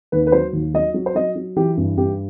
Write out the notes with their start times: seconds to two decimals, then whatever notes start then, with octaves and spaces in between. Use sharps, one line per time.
0.12 D#2 B4
0.27 B4
0.32 F#3 C5
0.53 D#2
0.74 F#3 D#5
0.94 F#3
1.06 C5
1.15 F#3 D#5
1.36 F#3
1.56 E3 G4
1.77 G2
1.97 G2 G4